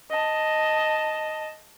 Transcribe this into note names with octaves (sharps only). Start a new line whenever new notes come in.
D#5 A5